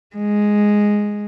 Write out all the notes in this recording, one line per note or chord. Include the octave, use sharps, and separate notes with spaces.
G#3